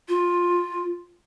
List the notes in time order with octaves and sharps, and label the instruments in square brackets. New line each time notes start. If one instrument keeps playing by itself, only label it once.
[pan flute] F4